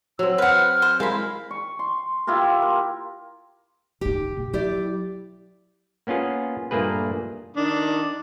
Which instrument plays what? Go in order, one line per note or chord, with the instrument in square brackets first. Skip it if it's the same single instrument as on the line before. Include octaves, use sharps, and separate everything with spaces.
[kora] F#3 C4 [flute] E6
[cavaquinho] B4 F#5 [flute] F6
[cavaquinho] C5
[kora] G#3 E4 [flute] A#4 [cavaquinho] F5 B5
[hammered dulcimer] C#6
C6
E4 F4 G4 A#4
A#4
[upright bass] F#1 D#4 [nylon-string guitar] G4
[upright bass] B2 A#3
[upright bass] F#3 [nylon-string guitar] E4 G4 D5
[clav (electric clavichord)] A#3 B3 C#4 F4 G#4
G2 A#2 A3 A#3 G#4 B4
[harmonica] D#3 D4